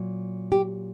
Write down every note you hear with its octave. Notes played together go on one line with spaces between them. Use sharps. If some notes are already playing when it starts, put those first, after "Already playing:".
Already playing: A#2 F#3
G4